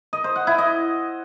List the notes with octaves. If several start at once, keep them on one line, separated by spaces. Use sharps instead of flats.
D#5
C5
F#5
E4
D#5